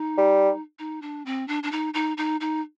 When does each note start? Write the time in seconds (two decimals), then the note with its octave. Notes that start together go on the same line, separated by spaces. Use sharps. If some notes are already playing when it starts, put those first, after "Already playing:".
Already playing: D#4
0.18 G3
0.79 D#4
1.02 D4
1.26 C4
1.48 D4
1.63 D4
1.72 D#4
1.94 D#4
2.17 D#4
2.40 D#4